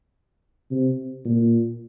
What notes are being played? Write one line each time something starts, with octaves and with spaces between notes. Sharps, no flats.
C3
A#2